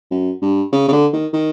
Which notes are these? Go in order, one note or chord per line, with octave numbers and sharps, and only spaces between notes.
F#2
G2
C#3
C#3
D3
D#3
D#3